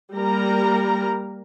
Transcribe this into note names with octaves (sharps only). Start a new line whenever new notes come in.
G3 A#3 A#4 A#5